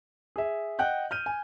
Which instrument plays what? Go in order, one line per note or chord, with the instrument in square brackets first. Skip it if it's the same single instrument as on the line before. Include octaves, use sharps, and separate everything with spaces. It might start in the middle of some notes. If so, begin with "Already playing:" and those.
[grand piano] G#4 E5
D#5 F#5 G5 F#6 G6
F6 G6 D#7
G#5